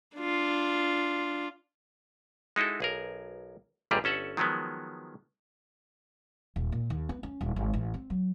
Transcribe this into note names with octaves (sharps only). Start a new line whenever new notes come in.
D4 F4
G#3 D#4 E4 F#4 A4
B1 G#4 A#4
G1 C#2 A#2 G3 G4 G#4
G1 C#4 A4 E5 F#5
D#3 F3 F#3 G#3 B3
D#1
A#2
D#2
B3
C#4
D#1
G#1
A1
C4
F#3